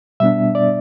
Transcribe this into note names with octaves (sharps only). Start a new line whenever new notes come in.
B2 G3 B3 D4 E5
D5